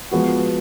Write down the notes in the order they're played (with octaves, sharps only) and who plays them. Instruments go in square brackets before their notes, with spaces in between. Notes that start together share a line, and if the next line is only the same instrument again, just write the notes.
[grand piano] F3 G#3 B3 F#4